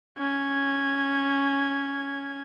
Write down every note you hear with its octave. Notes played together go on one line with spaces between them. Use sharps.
C#4 G#6